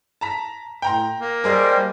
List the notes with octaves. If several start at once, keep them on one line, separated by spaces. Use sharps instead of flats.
A5 A#5 B6
A2 G5 A#5 C6
A#3
G3 G#4 A#4 C5 D#5